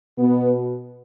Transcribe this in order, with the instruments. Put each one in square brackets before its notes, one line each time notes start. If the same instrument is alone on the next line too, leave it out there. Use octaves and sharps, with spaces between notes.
[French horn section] B2 B3